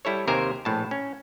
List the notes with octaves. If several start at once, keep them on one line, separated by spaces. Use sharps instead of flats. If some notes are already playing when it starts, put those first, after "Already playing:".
G3 E4 A4 C#5
D#2 C3 A#4 C5 G#5
A#1 A2 A5
C#4